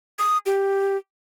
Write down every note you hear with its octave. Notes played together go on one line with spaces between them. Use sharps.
D#6
G4